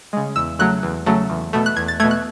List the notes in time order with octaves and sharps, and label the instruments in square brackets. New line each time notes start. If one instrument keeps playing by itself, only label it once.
[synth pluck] C#3 G#3
E2 E6
C#3 F#3 A3 F#6
E2
C#3 F#3 A3
E2
B2 A3
F#6
E2 G#6
A6
B2 A3 G#6
F#6